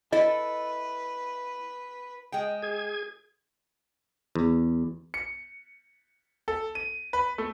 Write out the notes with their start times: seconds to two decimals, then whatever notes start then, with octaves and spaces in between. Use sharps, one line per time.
0.12 E4 A4 B4 D#5
2.32 G#3 G5
2.62 G#4 G#6
4.35 E2
5.14 C#7
6.48 A4
6.75 D#7
7.13 B4
7.38 A3